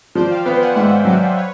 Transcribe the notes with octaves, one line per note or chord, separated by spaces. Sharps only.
F3 C5 D5
F5 G5
B3 F5 G5
F#5 G#5
G#2 E5 F#5
F#3 C5 D5
B4 C#5